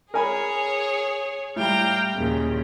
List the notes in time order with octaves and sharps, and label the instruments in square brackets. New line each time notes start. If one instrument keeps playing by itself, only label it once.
[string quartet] G#4 C#5 [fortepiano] A#4 G#5 B5
[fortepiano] A2 G3 [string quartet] F5 G5 A#5
[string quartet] D#2 A#2 C#3